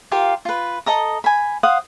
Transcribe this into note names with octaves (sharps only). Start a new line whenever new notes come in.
F4 G4 A#4 F5
F4 B4
A4 D#5 A#5 D#6
G#5 B5
C5 F5 F#5 D#6